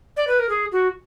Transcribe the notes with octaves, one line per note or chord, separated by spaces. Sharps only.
D5
B4
A#4
G#4
F#4